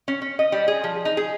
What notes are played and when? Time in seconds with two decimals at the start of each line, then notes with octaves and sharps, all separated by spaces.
0.08 C#4
0.22 C#4
0.39 D#5
0.52 G3
0.68 G#4
0.84 F3
1.05 D#4
1.17 G#4